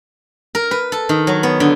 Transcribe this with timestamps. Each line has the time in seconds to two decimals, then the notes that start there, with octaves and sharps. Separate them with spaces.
0.55 A#4
0.71 B4
0.92 A4
1.09 D#3
1.27 F#3
1.43 B3
1.60 D3